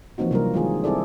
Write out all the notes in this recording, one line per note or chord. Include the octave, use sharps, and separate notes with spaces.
E3 F3 A#3 C4 D#4 F#4
C3 F#3 G3 A#3 D4 A#4
D#3 G#3 C4 F4 G#4
G3 C4 E4 G#4 A4 D5